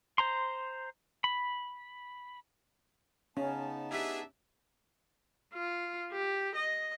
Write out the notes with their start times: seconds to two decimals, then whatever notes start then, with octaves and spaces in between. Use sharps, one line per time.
0.18 C5 A#5 C6
1.24 B5
3.37 C#3 B3 C#4 D#4 A5
3.91 D4 E4 G4 G#4 B4 E5
5.53 F4
6.12 G4
6.55 D#5